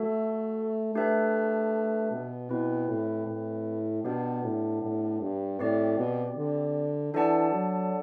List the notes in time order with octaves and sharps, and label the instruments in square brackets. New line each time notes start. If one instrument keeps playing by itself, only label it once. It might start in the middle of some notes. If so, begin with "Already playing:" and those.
Already playing: [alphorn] A3 [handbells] F#4 A4 E5
[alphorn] A3 [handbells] D4 G4 B4 E5
[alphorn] B2
[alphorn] B2 [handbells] C4 E4 B4
[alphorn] A2
A2
[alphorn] B2 [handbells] B3 D4 G4
[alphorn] A2
A2
G2
[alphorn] A2 [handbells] C4 G4 D5
[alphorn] B2
D3
[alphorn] E3 [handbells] D4 A4 D5 F#5 A5
[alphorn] F#3